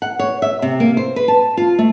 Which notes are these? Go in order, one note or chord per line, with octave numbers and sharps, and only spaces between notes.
F#5
C#5
E5
C3
A#3
C5
B4
A5
F4
A3